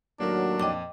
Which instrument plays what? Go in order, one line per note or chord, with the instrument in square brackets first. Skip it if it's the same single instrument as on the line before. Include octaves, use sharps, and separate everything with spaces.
[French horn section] D#2 A2 F#3 [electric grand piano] A#3 F#4 A#4 [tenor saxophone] D4
[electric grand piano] F2 A#2 [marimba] D#5 G5 D6